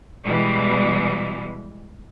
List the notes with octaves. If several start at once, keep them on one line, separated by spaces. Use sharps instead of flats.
B2 E3 G3 G#3